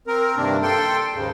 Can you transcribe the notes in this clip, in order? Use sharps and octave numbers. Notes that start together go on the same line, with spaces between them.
C4 A#4
G2 C3 D#3 A#3 D4
A4 G5 C6
D#2 G#2 C#3